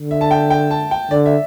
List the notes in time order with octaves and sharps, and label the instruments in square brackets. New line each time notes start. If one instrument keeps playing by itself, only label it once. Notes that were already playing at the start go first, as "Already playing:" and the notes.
Already playing: [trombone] D3
[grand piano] E5
A5
G5
G5
A5
G5
[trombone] D3 [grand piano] D5
[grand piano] E5